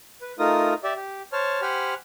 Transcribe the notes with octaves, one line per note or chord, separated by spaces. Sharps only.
B4
A3 D#4 F4 A#4 D#6
G4 D5 E5
G4
C5 C#5 A5 F6
G4 C5 F#5 G#5 B5 F6